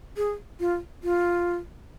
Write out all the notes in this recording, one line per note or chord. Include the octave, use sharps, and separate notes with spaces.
G#4
F4
F4